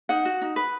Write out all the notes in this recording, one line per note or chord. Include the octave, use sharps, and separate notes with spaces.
D#4 F#5
F#4
D#4
B4